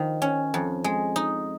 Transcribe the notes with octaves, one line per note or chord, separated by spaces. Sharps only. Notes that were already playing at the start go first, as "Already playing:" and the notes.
Already playing: D#3 F3
C#4
F2
G#3
D#4